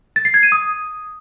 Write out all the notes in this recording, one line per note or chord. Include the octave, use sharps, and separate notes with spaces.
A6
C7
G#6
D#7
D#6